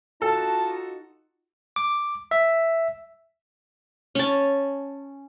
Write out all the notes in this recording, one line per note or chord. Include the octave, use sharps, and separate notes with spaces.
D#4 F4 F#4 A4 A5
D6
E5
C#4 A5